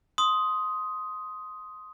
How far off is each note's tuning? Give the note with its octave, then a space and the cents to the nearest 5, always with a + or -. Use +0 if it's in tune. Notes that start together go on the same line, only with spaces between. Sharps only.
C6 +0 D#6 +10